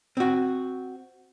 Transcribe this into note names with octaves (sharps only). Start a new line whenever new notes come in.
C4 F#4